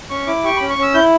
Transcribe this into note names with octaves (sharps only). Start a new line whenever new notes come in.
C#4 C#6
E4 D6
G4 C#6
C#4 B5
C#6
C#4 E6
E4 G6